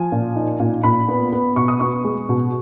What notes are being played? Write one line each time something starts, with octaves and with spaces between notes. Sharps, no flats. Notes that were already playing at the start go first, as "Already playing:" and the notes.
Already playing: F3 G#5
A#2
D#4
A#2
A#2 B5
B3
B3
B2 C#6
D#6
B3 C#6
G#3
B2